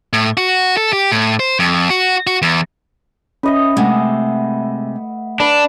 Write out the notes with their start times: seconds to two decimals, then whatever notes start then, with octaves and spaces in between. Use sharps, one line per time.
0.13 A2
0.37 F#4
0.77 A4
0.93 G4
1.12 A2
1.40 C5
1.59 F2
1.90 F#4
2.27 F#4
2.42 E2
3.43 C#4 B4 D#5 E5
3.77 C3 G#3 A3 E5 F#5
5.40 D4 B4